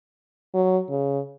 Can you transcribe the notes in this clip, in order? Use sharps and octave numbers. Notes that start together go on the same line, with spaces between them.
F#3
C#3